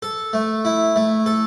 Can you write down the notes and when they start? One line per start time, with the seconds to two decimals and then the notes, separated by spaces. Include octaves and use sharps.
0.02 A4
0.33 A3
0.65 E4
0.96 A3
1.26 A4